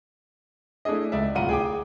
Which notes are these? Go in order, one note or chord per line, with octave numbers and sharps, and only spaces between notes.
A3 D4 E4 G#4 D#5
C#2 D5 E5
D1 C2 F4 F#5 A#5 D#7
G#4 G5 D6